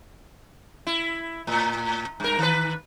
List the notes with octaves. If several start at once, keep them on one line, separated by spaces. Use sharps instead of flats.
E4
A2
G2 A#4
D#3 B4